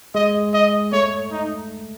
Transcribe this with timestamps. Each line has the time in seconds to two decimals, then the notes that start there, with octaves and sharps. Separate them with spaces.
0.15 G#3 D#5
0.54 D#5
0.92 A3 C#5
1.32 D#4